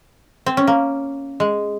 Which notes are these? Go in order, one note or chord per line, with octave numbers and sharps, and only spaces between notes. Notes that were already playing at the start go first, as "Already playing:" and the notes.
C4
C#4
A#3
G#3